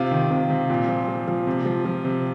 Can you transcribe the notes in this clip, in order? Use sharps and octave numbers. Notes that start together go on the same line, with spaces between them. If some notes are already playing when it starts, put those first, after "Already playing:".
Already playing: C3 F4
D#3
C3
C3
A#2
F3
F3
F3
C3
F3
F3
C3